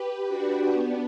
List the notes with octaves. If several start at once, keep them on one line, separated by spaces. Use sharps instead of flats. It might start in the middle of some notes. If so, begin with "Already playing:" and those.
Already playing: G4 B4
D4 F#4
B3 D4